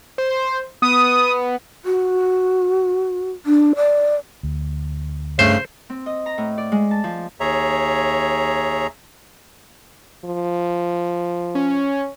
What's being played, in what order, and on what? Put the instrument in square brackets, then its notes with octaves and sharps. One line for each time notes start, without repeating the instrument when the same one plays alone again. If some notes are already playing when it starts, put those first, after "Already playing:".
[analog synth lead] C5
[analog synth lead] B3 [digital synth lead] D#6
[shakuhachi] F#4
D4
D5
[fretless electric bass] D2
[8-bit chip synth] G2 A3 C7 [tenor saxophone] C#3 [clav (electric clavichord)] C5
[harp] C4
D#5
A#5
A2
D5
G#3
A5
F3
[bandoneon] D#2 G#4 C#5 E5 A#5
[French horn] F3
[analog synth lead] C#4